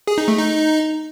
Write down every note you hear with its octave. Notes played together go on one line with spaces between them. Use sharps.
G#4
D#4
A3
D#4